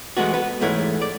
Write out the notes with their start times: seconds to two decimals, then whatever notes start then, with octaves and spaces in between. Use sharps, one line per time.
0.17 E3 G#3 A3 B3 F#4
0.34 B3 B4
0.61 E2 G#2 A3 E4 C#5
1.02 D5